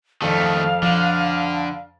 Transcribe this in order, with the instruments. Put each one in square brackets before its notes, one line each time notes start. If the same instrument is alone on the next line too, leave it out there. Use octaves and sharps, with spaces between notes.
[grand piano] F2 A4 D5 [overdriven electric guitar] D#3 A3 [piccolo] F5
[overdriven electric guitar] D3 [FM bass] F3